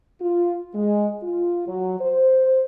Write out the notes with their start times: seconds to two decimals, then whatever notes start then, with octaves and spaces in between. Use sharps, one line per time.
0.20 F4
0.75 G#3
1.22 F4
1.66 F#3
2.00 C5